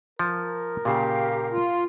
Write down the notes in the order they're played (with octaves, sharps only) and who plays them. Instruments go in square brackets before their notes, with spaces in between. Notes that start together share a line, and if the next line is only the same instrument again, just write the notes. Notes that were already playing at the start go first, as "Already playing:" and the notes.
[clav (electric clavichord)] F3 [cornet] A#4
[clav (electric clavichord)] A#2 C#3 [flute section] G4 F5
[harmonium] F4